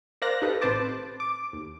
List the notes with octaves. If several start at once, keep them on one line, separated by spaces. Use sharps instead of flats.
A#4 C5 D5 F5 F#6 A#6
D#4 G4 A4 B4
A1 C4 B4 C5 A5 D6
D6
D#2